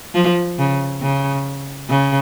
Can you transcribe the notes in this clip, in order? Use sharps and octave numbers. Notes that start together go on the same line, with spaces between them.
F3
C#3
C#3
C#3